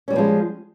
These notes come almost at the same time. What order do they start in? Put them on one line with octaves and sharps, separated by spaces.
C#4 G3 B3 F3 G#3